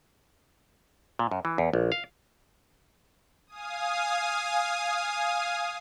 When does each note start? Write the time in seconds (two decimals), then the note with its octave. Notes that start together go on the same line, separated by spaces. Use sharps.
1.19 A#2
1.31 F#2
1.45 E3
1.58 E2
1.73 A#1
1.92 F5
3.47 F5 G#5 D#6